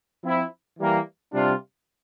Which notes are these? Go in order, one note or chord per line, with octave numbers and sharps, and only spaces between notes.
F3 C4 E4
E3 G3 A#3
C3 G3 D4 F4